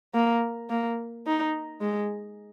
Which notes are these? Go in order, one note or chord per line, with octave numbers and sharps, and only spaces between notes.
A#3
A#3
D#4
G#3